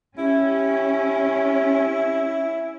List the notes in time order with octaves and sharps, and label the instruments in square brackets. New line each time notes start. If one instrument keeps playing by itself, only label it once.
[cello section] C#4 [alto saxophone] E4 [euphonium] G4